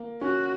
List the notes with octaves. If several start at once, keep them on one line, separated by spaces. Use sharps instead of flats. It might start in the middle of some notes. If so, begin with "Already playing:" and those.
Already playing: A#3
C#4 F#4